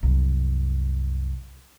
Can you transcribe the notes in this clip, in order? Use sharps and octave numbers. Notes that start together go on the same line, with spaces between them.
C2 F#2